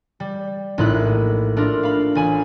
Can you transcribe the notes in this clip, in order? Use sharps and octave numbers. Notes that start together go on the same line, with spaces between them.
G3
A#1 A2 D#4 E4 B5 F#6
A3 D4 F4 A#4
F5 B5
A1 G#5 B5